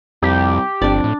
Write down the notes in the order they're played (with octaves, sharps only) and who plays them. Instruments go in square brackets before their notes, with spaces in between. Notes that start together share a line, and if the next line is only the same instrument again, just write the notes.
[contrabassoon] C2 [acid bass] F2 [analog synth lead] G4
[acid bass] G1 [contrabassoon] F2 [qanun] D4 D5
[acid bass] A2